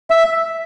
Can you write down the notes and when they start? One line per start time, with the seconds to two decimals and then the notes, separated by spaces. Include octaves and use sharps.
0.10 E5